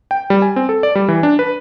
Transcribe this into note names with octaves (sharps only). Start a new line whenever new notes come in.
G5
G3
G#5
C4
A4
D5
G3
E3
D4
B4